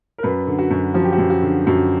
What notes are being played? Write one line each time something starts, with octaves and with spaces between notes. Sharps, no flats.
A#4
F#2 B4
D3
F#4
F#2
F3 F#4
G4
F#4
F#2
F#4
D3
F#2 F#4